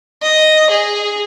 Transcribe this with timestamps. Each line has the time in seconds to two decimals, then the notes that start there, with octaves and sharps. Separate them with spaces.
0.23 D#5
0.70 G#4